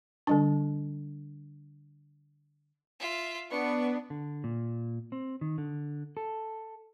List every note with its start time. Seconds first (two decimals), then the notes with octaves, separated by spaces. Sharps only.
0.27 D3 G3 D4
3.00 F4 E5
3.51 B3 D4 C#6
4.10 D3
4.44 A#2
5.12 C4
5.41 D#3
5.58 D3
6.17 A4